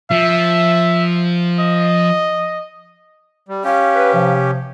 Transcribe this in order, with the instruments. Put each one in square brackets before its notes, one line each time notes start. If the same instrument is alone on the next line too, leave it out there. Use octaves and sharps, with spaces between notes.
[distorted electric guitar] F3 [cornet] E5
[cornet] D#5
[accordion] G3
[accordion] C#4 G4 [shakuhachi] F5
[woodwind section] B4
C3 F3